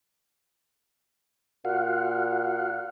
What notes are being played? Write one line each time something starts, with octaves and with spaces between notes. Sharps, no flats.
A#2 F#4 F5 F#5